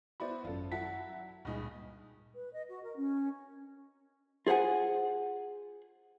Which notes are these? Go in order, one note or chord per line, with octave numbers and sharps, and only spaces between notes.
B3 E4 F#4 C5 D5 B5
G#1 F#2 F4 A4
F#3 E4 F#5 A5 B6
C#2 G2 A#2 D#4 G#4
B4
D#5
F#4
A#4
C#4
F4 G#4 C5 F#5 G#5